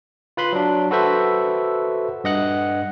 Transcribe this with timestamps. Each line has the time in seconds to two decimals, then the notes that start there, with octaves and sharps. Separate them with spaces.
0.37 F4 B4 B5 C6
0.53 F#3 D4
0.91 F#4 A4 B4 C5 E5
2.24 G2 D#5 F#5 F#6